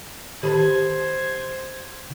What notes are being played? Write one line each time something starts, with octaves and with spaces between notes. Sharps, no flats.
G4 A4 B4 C5 A5 G#6